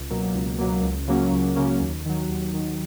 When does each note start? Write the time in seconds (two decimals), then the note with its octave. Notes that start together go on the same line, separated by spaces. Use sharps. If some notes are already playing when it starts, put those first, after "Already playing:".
Already playing: C#2
0.10 B2 F#3 A#3
0.35 C#2
0.59 B2 F#3 A#3
0.83 C#2
1.08 C#3 F#3 A#3 C#4
1.32 C#2
1.56 C#3 F#3 A#3 C#4
1.81 D#2
2.05 D#3 F#3
2.29 D#2
2.54 D#3 F#3